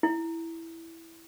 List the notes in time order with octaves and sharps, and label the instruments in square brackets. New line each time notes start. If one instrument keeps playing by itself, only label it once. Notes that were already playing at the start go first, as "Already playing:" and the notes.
[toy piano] E4